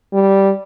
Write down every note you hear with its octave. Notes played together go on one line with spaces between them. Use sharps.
G3